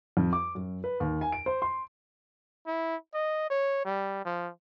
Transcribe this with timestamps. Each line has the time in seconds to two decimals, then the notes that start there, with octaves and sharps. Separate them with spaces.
0.17 F2
0.33 D6
0.55 F#2
0.84 B4
1.00 D#2
1.21 G#5
1.32 D7
1.46 C5
1.62 C6
2.67 E4
3.14 D#5
3.50 C#5
3.85 G3
4.25 F3